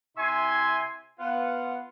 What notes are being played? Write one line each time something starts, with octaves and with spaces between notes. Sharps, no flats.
C3 E4 E5 G#5 C6
B3 F4 F#5